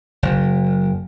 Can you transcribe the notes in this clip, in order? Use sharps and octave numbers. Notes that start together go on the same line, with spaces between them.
F#1